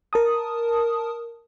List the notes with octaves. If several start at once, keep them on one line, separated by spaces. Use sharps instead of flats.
A#4 A5 D#6